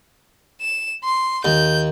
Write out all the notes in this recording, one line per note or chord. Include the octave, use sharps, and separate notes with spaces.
E7
C6
D#2 G6